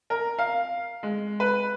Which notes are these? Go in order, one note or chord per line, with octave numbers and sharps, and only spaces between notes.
A#4
F5
G#3
B4